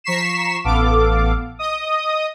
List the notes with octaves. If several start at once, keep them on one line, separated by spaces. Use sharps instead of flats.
F3 A#5 C#6 B6 C7 E7
A1 B3 A4 F5 D6
D#5 D#6